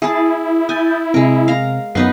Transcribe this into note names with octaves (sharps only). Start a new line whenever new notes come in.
E4 G#4 A5
G#5 D#6 G6 A6
C3 G#3 C4 A#4
F5 A#5
F#2 B3 D#4 B4 C7